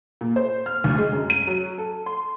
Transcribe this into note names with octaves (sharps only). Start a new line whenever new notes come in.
A#2
C5
F6
D2
G#3
F#2
D#7
F#3
A4
C6